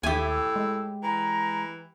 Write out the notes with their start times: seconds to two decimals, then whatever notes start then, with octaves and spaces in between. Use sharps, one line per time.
0.03 D#2 A2 G4 E5 G#5
0.29 E6
0.56 G#3
1.03 E3 A#5